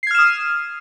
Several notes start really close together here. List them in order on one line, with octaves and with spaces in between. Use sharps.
C7 G#6 F6 E7 D#6